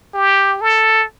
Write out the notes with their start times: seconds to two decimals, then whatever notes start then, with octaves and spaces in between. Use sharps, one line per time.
0.14 G4
0.61 A4